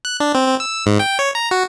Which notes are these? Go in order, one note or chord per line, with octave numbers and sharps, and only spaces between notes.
F#6
D4
C4
C4
E6
G#2
G5
C#5
A#5
F#4